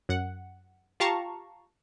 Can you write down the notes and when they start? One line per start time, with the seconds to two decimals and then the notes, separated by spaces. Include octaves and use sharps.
0.09 F#2 F#5
1.00 F4 G4 F5 A5 A#5 C#6